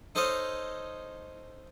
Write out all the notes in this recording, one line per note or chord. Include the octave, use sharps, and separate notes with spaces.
D#4 A4 C5 C#5 D#5 F5